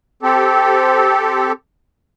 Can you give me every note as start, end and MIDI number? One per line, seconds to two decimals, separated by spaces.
0.23 1.52 60
0.23 1.52 67
0.23 1.52 69